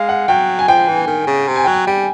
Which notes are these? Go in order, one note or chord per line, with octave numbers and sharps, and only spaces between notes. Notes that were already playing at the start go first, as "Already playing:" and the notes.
Already playing: G#3 F5
F#5
F#3 G5
G#5
F3 G5
E3
D#3
C#3
C3
G#5
F#3 G5
G#5
G3 G5